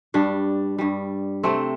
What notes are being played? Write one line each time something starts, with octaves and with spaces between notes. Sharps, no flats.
G2 G3 D4
G2 G3
C3 A3 C4